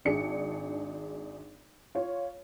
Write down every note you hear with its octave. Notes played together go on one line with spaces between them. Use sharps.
G#1 D4 G#4 C#7
F4 C#5